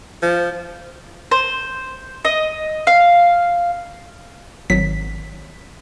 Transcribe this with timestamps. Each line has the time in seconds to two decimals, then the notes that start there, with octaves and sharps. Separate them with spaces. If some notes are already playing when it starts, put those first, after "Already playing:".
0.22 F3
1.31 C5
2.25 D#5
2.87 F5
4.70 G#1 F#3 B6